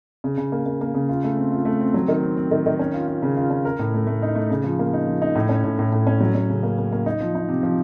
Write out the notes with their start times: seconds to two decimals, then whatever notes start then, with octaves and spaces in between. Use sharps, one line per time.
0.24 C#3
0.37 C#3
0.52 A#3
0.66 A#3
0.81 A#3
0.94 C#3
1.09 F4
1.24 A3
1.37 C4
1.52 F4
1.65 A3
1.80 C4
1.94 F#3
2.08 D#3
2.23 C4
2.37 C4
2.51 D#3
2.66 D#3
2.79 C#4
2.94 F4
3.08 F4
3.22 C#3
3.37 F4
3.50 C#4
3.65 A#4
3.79 A2
3.94 A3
4.07 A3
4.22 D#4
4.35 A3
4.51 C#3
4.64 F3
4.79 A#3
4.93 D#4
5.07 F3
5.22 D#4
5.35 A2
5.49 C#4
5.64 A2
5.79 A2
5.92 A2
6.07 C#4
6.21 F#3
6.35 F#3
6.50 C#3
6.63 A#3
6.78 A#3
6.92 A#3
7.06 D#4
7.20 F3
7.35 D#4
7.48 C3
7.63 F3